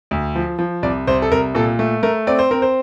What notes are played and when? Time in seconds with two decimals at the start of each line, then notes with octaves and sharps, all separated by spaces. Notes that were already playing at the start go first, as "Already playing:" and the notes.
0.11 D2
0.35 F3
0.59 F3
0.83 C2 D5
1.07 C2 C5
1.22 A4
1.31 C2 A#4
1.55 A#2 A4
1.79 A3
2.03 A3 A#4
2.27 C4 D5
2.39 C5
2.51 C4 A#4
2.62 C5